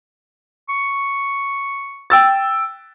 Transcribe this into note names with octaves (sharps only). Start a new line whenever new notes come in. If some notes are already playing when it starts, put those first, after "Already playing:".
C#6
G5 E6 A6